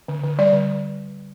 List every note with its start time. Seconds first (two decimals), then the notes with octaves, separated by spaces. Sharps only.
0.08 D3
0.23 D3
0.39 G3 D5
0.53 D3